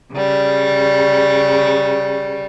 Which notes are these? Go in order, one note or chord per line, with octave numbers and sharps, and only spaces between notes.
C#3 G3